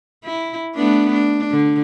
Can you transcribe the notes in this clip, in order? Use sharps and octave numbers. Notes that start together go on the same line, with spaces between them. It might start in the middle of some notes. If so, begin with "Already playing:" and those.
E4
A3 B3 D4
D4
D3